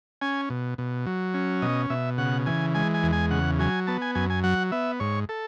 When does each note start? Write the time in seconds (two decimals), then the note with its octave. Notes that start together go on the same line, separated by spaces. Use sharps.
0.21 C#4 G#5
0.50 B2
0.78 B2
1.06 F#3
1.34 C#4
1.62 B2 D#5
1.90 B2 E5
2.18 C#3 F#5
2.46 E3 G#5
2.74 G#3 G#5
2.94 G#5
3.03 E2
3.13 G#5
3.31 C#3 F#5
3.59 F#3 G#5
3.87 B3 A5
4.02 G#5
4.15 F#2 G#5
4.30 G#5
4.44 F#3 F#5
4.72 B3 E5
5.00 G#2 C#5
5.29 A4